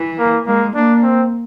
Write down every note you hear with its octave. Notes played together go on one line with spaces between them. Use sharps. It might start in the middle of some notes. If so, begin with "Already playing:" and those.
Already playing: E3
A#3
G#3 A#3
A#3 D4
C4